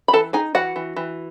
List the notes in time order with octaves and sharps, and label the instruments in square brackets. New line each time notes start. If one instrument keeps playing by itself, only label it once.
[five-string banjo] B5
E3 A4 A5
D#4 G#4 G#5
E3 F#4 F#5
E3
E3